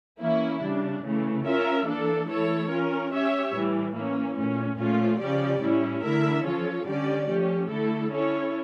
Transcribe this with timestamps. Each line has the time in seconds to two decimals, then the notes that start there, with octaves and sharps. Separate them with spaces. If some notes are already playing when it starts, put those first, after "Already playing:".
0.20 E3 A#3 C#4 E4
0.61 C#3 G3 D4
1.03 C#3 E3 A3
1.44 C#4 F4 A#4 E5
1.86 E3 A#3 D4 A4
2.28 E3 A3 E4 A4 C#5
2.70 C#4 F4 A#4
3.12 C#4 G4 C#5 E5
3.53 A2 E3 G3
3.95 E3 A#3 C#4
4.37 A#2 A3 C#4
4.79 A#2 F3 A3 C#4 F4
5.20 C#3 F3 C#4 G4 D5
5.61 A2 G3 C#4 E4
6.03 D3 A3 E4 A#4 E5
6.45 F3 C#4 F4 A4 C#5
6.87 D3 G3 C#4 G4 D5
7.28 F3 A3 C#4 G4
7.70 D3 A3 E4 A4
8.12 C#4 E4 A4 C#5